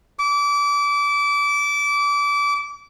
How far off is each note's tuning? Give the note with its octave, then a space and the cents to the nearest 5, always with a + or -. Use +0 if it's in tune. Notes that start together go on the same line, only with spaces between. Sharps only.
D6 -25